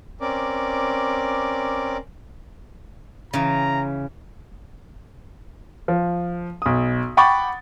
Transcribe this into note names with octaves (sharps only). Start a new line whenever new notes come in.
C4 C#4 A#4 D5 D6
C#3 E3 A#5
F3
B1 D#6
F#5 G5 B5 C#6 D6 A6